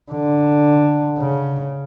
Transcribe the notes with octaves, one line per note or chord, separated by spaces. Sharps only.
D3
C#3